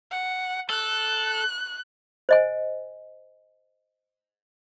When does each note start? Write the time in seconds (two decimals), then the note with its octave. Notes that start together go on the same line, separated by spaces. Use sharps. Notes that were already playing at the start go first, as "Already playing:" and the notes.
0.11 F#5
0.70 A4 F#6
2.29 C5 D#5 G#5